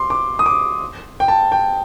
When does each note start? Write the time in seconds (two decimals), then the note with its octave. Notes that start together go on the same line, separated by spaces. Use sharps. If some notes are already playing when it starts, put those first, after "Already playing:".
Already playing: C6 D6
0.10 D6
0.39 D#6
0.46 D6
1.20 G5
1.28 A5
1.52 G5